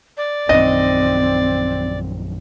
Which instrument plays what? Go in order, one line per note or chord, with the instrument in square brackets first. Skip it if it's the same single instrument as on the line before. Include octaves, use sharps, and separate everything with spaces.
[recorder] D5
[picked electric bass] A#1 F#2 D#3 [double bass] C4 [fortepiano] D#5